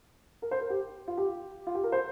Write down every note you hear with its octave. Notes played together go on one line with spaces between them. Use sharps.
A#4
C5
A#4
G4
F4
G4
F4
G4
A#4
C5